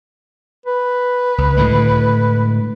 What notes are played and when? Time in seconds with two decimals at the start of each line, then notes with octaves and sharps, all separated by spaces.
0.66 B4
1.38 C#2
1.57 A2 D3 G#3